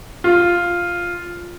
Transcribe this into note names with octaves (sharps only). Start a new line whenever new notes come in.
F4